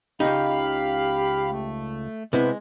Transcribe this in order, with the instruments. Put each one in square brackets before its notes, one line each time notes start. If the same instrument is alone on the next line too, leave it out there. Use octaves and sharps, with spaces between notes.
[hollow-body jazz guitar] C#2 D#4 [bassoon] G4 [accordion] F5 B5
[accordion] A3
[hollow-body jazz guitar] C3 E4 [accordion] G#3 [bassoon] B3